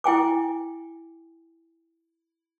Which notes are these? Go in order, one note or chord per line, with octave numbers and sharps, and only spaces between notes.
E4 G5 G#5 D6